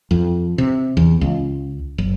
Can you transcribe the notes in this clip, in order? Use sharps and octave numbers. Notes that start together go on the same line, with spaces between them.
F2
C3
E2
C#2
F#1